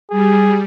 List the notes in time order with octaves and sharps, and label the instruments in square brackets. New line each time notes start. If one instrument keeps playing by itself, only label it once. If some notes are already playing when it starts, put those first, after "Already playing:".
[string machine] G3 [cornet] G#4